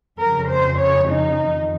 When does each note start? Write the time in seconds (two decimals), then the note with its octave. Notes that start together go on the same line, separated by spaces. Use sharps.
0.19 F2 C#3 A#4
0.49 C5
0.79 C#5
1.10 D#4
1.40 F2 D#3